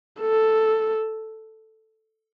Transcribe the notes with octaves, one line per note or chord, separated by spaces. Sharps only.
A4